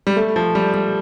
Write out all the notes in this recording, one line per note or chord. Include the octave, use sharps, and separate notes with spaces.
G3
A3
F3
G3
G3